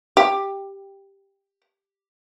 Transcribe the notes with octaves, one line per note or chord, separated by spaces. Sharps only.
G4